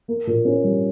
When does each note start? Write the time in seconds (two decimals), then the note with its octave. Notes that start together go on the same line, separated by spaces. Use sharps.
0.08 A#3
0.27 A#2
0.45 C#4
0.64 G3